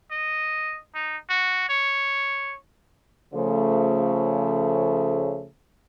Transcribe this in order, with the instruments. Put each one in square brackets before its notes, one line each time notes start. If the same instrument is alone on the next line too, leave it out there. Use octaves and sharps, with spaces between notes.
[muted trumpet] D#5
D#4
F#4
C#5
[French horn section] C#3 F3 A3